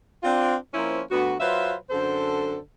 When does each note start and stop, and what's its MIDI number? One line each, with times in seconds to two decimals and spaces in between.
0.23 0.55 60
0.23 0.55 62
0.23 0.55 65
0.73 1.01 53
0.73 1.01 58
0.73 1.01 60
0.73 1.01 61
0.73 1.01 64
0.73 1.01 72
1.11 1.34 38
1.11 1.34 59
1.11 1.34 66
1.40 1.74 54
1.40 1.74 65
1.40 1.74 71
1.40 1.74 72
1.40 1.74 76
1.40 1.74 77
1.90 2.58 42
1.90 2.58 50
1.90 2.58 60
1.90 2.58 69
1.90 2.58 72